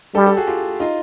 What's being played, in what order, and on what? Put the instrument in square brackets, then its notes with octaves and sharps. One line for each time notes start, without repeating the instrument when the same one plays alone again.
[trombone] G3 [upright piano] G4 A4
[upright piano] G4 A4
F#4 G#4
F4 G4
D#4 F4